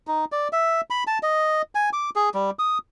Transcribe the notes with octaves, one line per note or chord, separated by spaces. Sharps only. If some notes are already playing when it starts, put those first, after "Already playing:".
D#4
D5
E5
B5
A5
D#5
G#5
D6
G#4
G3
D#6